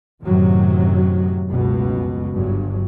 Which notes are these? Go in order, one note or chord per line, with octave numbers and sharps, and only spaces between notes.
F#2 A2 C3 D#3 F#3
F1 C#2 F#2 B2
G1 G2 F#3